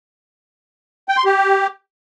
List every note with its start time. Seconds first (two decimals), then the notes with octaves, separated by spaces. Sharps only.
1.09 G5
1.17 C6
1.25 G4